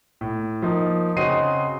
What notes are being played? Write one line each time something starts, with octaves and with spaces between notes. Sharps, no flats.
A2
F3 A#3 D#4
C#3 C4 F#4 D#5 C7 D#7